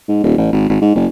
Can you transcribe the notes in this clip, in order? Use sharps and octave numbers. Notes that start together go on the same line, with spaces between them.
G#2
D#1
A1
G#1
G#1
G#2
F#1